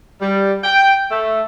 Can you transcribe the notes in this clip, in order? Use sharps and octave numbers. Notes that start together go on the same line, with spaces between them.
G3
G5
A3